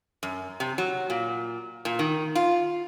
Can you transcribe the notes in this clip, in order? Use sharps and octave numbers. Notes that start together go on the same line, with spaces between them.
F#2
C3
F#3
A#2
A#2
D#3
F4